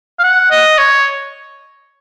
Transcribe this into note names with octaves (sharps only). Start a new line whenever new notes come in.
F5
F#5
D#5
C#5